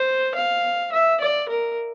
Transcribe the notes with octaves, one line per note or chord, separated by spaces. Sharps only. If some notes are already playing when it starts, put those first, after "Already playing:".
Already playing: C5
F5
E5
D5
A#4